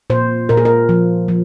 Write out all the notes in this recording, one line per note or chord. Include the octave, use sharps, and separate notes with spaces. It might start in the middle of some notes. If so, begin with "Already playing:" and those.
A#2 C5
A#2 A#4
G#4
A#4
F3
F3